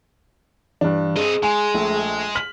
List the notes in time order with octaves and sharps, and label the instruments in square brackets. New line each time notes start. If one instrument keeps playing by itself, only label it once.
[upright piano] G2 D4 [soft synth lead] E3
[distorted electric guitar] C4 D#5 [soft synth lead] G#4
[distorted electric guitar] G#3 [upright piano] G#5
[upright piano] A#1 A3
F6 B6 F#7